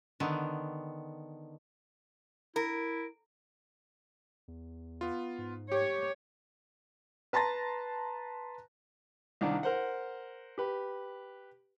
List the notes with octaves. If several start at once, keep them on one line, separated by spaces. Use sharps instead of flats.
D3 D#3 B3
E4 A#4
E2
B3 F4
G#2
G4 C#5
B4 A5 A#5 C6 A6 A#6
C2 D#3 D4
A#4 C5 F#5
G4 B4